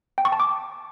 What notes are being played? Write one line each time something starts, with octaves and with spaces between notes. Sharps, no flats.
G5
C#6
A5
D6